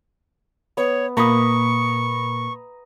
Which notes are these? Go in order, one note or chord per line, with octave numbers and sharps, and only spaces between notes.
B3 C#5
A#2 A#3 A#5 B5 C#6 D#6